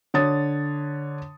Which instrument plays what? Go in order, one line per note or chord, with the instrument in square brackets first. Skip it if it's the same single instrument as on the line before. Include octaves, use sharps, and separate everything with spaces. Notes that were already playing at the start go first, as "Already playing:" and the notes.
[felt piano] D3 C#5 D#6 A6